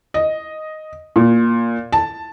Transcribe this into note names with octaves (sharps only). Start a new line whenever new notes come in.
D#5
A#2
A5